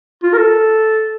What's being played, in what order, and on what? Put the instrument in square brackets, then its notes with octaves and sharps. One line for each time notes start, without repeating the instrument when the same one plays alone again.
[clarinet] F4
A#4
A4